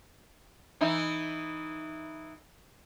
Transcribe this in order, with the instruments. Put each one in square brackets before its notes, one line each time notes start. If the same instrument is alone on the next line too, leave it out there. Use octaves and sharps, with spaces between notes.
[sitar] E3 D#4 E4